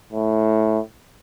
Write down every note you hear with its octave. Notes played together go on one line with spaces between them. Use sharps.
A2